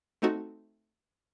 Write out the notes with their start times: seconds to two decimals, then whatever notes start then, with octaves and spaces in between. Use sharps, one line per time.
0.22 A3 C4 D#4 F#4 A4